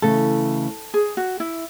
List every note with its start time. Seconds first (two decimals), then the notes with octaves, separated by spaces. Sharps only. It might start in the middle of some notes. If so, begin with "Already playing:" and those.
0.02 C#3 E3 A3 A4
0.94 G#4
1.17 F#4
1.40 E4